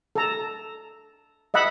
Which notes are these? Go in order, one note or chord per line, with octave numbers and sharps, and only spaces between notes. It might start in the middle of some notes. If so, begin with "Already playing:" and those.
A4 A#5
D#5 E5 F#5 B5